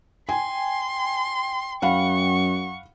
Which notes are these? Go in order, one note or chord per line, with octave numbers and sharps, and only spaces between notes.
G5 G#5 C6
F#2 F5 F#5 B5 C#6